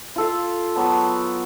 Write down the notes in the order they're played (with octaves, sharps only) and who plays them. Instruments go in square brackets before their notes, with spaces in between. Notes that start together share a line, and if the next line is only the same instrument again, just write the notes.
[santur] F4 A4 F5
[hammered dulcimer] F#3 B3 A5